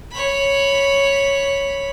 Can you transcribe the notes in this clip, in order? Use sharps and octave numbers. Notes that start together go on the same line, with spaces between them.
C#5 B5